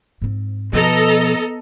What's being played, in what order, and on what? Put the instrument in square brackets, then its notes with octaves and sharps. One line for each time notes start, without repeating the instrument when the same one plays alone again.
[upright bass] G#2 C4
[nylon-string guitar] B2 [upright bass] F3 [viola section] A4 D#5 A#5